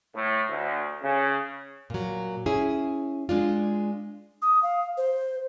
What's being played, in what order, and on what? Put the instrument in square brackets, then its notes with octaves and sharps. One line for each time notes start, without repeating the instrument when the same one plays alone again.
[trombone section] A2
D2
C#3
[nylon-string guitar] A#2 F#3
C#4 E4 G#4
G#3 D4 F4
[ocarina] D#6
F5
C5